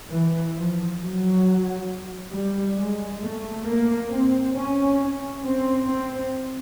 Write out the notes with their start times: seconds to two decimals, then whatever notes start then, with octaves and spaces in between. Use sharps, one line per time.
0.11 E3
0.55 F3
1.00 F#3
2.34 G3
2.77 G#3
3.22 A3
3.66 A#3
4.11 C4
4.56 C#4
5.00 C#4
5.44 C4
5.89 C4